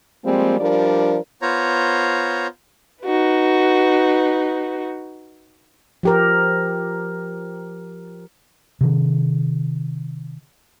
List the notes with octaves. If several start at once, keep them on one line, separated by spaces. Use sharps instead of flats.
F3 G3 G#3 A#3 C4
F3 G3 D4 A#4 D5
B3 F4 C5 C#5 A#5
D#4 F#4 B4
F3 G4 A#4
C3 D#3